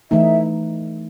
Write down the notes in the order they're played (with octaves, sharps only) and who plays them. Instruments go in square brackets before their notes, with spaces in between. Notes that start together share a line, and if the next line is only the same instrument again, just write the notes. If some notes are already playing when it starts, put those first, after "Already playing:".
[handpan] E3 A3 D#4 [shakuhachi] E5